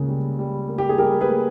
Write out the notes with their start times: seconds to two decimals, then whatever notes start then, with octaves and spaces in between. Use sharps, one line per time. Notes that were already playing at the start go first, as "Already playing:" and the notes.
Already playing: C#2 C#3 A#3
0.09 G3
0.39 G3
0.68 A#3
0.78 G4
0.89 G#4
0.98 G3 G4 A#4
1.21 G#4 B4
1.28 A#3